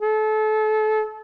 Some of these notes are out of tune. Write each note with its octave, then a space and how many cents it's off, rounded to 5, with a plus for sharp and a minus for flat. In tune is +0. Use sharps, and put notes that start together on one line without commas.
A4 -30